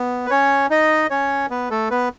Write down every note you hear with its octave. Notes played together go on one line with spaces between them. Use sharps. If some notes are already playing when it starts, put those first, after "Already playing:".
Already playing: B3
B4
C#4 C#5
D#4 D#5
C#4 C#5
B3 B4
A3 A4
B3 B4